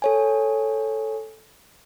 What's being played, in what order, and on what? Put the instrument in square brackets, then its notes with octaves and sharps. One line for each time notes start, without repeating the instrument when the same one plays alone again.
[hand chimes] A4 C#5 G#5